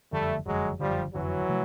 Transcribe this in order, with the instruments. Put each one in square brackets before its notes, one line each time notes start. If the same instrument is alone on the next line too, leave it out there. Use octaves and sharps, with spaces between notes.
[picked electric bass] F#1 F2 D3 [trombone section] G3 A3
[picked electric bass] F#1 F2 D3 [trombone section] F#3 G#3
[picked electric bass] F#1 F2 D3 [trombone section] F3 G3
[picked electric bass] F#1 F2 D3 [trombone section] E3 F#3
[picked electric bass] C3 F3 A3